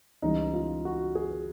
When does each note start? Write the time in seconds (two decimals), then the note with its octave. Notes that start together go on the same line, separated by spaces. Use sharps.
0.22 C#2 C#3 E3 G3 D#4
0.53 F4
0.85 F#4
1.15 G#4